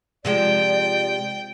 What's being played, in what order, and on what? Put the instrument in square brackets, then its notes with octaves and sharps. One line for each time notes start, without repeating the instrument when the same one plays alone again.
[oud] C3 F3 G#3 [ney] D5 [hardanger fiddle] G5